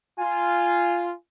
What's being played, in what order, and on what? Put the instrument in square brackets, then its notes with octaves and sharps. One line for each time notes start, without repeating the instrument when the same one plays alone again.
[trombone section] F4 [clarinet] G#5